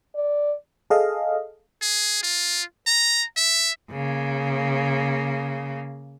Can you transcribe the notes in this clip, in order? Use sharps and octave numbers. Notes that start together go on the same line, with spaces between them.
D5
G#4 A4 D#5 F5
G#4
F4
A#5
E5
C#3 A#3